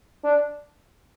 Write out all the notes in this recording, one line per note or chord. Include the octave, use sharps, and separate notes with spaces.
D4